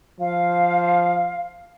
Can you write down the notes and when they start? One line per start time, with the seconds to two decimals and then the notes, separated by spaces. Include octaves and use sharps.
0.20 F3 F5